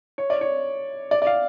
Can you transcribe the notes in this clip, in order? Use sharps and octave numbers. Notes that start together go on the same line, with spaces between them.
C#5
D5
C#5
D5
D5
F5